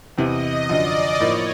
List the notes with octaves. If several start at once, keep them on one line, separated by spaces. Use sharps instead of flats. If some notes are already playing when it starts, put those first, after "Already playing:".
E2 C3 E3 D#5
F#2 D3 F3 D5
A2 F3 A#3 D#4 C#5